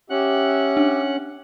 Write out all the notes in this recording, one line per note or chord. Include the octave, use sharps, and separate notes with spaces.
C#4 G4 E5 F#5 F#6
D4